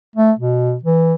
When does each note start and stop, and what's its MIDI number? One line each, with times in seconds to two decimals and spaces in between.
0.16 0.32 57
0.39 0.76 47
0.83 1.15 52